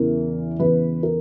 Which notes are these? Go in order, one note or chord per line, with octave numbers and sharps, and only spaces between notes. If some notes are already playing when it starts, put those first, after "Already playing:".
Already playing: E2 C#3 E3 A#4
E2 C#3 E3 B4
A#4